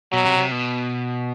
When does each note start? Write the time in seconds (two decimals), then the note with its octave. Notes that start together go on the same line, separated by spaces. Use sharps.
0.12 B2 F#3
0.26 C3
0.38 C3
0.51 B2